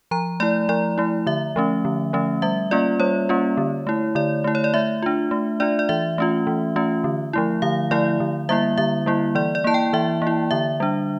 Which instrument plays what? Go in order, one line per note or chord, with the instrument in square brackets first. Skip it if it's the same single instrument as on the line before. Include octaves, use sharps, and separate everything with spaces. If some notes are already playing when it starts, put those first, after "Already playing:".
[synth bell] F3 A#5
A3 E4 D5
F3 D5
A3 E4
D3 E5
F3 A3 C#4
D3
F3 A3 C#4
G3 E5
A#3 C#4 F4 D5
G3 C#5
A#3 C#4 F4
D3
A3 E4
D3 D5
A3 E4
C#5
D5
A3 E5
D4 F4
A3
D4 F4 D5
D5
E3 E5
A3 C#4 F4
E3
A3 C#4 F4
D3
F3 A3 E4
D3 F5
F3 A3 E4 D5
D3
G3 A#3 E4 E5
D3 E5
G3 A#3 E4
E3 D5
D5
A#3 E4 A5
G5
E3 E5
A#3
E4
D3 E5
G3 D4